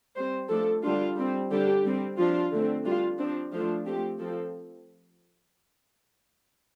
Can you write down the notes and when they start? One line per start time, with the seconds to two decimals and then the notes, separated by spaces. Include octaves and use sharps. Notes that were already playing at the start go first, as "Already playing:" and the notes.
0.16 G3 C4 C5
0.50 F3 A3 D4 A4
0.84 D3 G3 D4 F4
1.17 G3 C4
1.51 D3 G3 D4 G4
1.85 G3 C4
2.18 F3 D4 F4
2.52 D3 A3 C4
2.86 G3 D4 F4
3.19 F3 C4 D4
3.53 F3 A3 D4 F4
3.86 F3 A3 C4 G4
4.20 F3 C4 A4